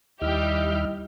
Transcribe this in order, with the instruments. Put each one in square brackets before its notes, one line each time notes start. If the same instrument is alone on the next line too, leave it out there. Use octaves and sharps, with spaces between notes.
[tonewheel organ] D#2 E4 F6 [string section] G3 G4 G6 [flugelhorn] D#5